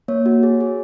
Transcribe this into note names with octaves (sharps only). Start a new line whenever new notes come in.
A#3 C#5
F#4
G#4
G#4